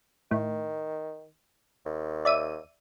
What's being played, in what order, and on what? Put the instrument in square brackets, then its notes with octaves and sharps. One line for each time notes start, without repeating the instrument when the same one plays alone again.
[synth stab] A2 [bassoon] D#3
[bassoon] D#2
[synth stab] D5 E5 D#7